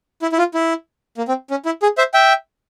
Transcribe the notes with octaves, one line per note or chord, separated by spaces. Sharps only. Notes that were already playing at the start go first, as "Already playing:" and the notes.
E4
E4
F4
E4
A#3
C4
C#4
E4
G#4
C5 E5
E5 G5